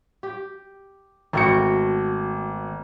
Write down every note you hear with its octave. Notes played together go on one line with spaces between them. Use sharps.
G4
G#1 B2 A3 F#4 G5 C#7